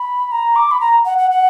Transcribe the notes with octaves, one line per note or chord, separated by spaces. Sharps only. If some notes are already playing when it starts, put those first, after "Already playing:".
Already playing: B5
A#5
D6
B5
A#5
F#5
F#5
F#5